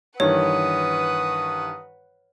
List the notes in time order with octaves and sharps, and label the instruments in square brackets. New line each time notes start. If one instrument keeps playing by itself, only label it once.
[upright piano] G2 D#3 E3 [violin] B4 F#5 [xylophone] C#5 [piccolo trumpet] D#6